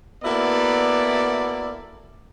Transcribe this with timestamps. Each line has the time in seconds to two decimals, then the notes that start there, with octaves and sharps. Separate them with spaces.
0.24 A#3 B3 E4 F#4 A4 D5